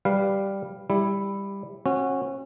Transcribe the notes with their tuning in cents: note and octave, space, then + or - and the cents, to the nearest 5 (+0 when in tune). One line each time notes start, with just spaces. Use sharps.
G3 +0 B4 +0 F5 +0
G3 +15 E4 +0
C#4 -35 F#4 -10